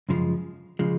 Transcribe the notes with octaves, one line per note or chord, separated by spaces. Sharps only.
F#2 C#3 F3 G#3
C#3 F3 G#3